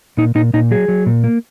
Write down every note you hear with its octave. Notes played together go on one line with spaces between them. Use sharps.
A#2 D#4
A#2 D#4
A#2 D#4
F#3 G#4
F#3
A#2
A#3